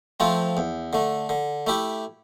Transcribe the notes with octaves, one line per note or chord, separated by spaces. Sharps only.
F3 A3 C4 F4
E2
D3 A3
D3
A3 E4 G4